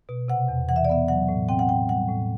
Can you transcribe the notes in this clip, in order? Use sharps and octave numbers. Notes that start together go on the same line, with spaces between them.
B2
C3 F#5
E2
E3 F#5
E5
D5
B3 E5
F#3 F#5
A2
C4 G5
F#5
A2 G5
G3 F#5
A2